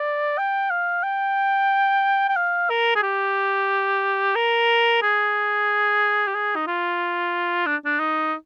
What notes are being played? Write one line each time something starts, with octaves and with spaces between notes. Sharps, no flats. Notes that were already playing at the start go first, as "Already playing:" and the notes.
Already playing: D5
G5
F5
G5
G5
F5
A#4
G#4
G4
A#4
G#4
G4
G#4
D#4
F4
D4
D4
D#4